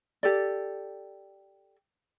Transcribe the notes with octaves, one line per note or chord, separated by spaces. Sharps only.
G4 A4 D5